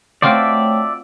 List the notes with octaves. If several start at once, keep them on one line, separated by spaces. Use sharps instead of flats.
A3 C4 F4 F#4 C#5 D5 E5 G5